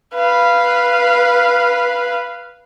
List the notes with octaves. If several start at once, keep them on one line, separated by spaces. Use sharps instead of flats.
B4 F5